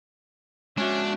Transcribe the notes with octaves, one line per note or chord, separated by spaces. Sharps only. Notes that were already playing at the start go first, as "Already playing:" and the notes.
G#3 C#4 D4 F#4 E5